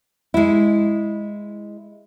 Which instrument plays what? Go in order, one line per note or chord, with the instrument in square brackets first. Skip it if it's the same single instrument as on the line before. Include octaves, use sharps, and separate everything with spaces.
[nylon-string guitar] G#3 E4